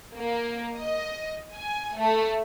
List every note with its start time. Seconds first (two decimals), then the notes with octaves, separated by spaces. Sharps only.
0.17 A#3
0.78 D#5
1.55 G#5
1.99 A3